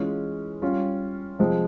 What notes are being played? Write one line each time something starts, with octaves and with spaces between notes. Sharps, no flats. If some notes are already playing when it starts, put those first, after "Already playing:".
Already playing: E3 G#3 C#4 F4
G3 C#4 F4
C3 F3 G#3